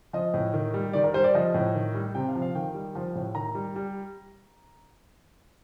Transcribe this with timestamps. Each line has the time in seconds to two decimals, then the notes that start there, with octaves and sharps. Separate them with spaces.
0.13 F3 D#5
0.34 A2
0.54 D#3
0.74 G3
0.93 D#3 D5
1.04 A#4
1.14 G3 C5
1.24 D5
1.34 F3 D#5
1.54 A2
1.74 D#3
1.94 G3
2.15 C3 G5
2.28 F5
2.35 F3
2.42 F5
2.55 D#3 G5
2.74 G3
2.95 F3
3.15 A2
3.35 D#3 A#5
3.55 G3
3.76 G3